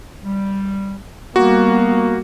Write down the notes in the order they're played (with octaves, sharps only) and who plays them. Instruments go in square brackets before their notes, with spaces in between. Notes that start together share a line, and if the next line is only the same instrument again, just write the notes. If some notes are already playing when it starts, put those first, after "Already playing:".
[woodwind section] G3
[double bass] G3 [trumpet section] A#3 [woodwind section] B3 [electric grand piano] F#4